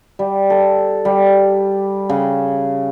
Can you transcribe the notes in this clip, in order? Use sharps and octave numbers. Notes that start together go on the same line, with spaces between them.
G3
A4
G3
C#3